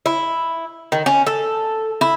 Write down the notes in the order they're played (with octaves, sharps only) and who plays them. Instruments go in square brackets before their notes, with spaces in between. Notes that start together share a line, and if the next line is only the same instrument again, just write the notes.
[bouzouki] E4
D#3
C#4
A4
E4